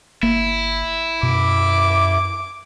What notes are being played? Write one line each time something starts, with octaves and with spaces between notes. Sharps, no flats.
G1 A#3 E4
F#2 B2 D6